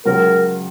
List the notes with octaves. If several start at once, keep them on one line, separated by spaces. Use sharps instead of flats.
C#2 C#3 F#3 A#4